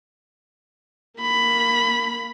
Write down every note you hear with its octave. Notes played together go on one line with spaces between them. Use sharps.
A#3 B5